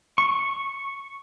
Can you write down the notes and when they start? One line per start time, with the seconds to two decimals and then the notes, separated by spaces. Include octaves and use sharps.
0.18 C#6